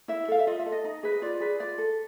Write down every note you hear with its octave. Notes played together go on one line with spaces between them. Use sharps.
E4 E5
A4 F5
E5
F4 D#5
E5
A4
D#5
D#4
G#4 B4
D#5
F4 D5
G#4 B4
F4 D5
A4